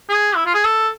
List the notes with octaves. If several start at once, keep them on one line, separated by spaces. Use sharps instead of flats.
G#4
E4
F4
G#4
A4